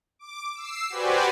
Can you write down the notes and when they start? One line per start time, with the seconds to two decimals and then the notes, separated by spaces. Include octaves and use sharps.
0.19 D6
0.55 E6 C7
0.90 F#4 G4 B4 C5 D5 G#5